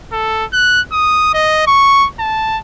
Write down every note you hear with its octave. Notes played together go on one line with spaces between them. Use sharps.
A4
F#6
D#6
D#5
C#6
A5